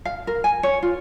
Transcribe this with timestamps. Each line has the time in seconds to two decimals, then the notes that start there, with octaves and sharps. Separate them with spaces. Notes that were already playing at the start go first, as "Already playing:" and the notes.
0.05 F5
0.27 A#4
0.44 G#5
0.63 C#5
0.83 F4